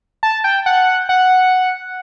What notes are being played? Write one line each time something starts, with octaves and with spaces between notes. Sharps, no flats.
A5
G5
F#5
F#5